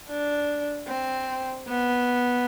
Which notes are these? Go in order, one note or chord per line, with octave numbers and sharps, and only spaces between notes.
D4
C4
B3